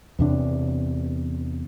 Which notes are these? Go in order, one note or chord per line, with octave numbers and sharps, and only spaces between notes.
E2 C3 D4